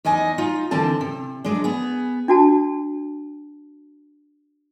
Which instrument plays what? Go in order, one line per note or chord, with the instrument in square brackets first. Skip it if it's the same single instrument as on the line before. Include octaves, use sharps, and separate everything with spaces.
[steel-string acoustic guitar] E2 D#4 D#5 G#5
D#4 F4
D#2 D3 E3 C4 A5
C3
F#3 G#3 D4
B3 G#4
[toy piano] D4 F#4 A5